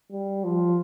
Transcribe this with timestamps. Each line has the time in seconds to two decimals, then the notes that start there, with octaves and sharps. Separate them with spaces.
0.11 G3
0.44 F3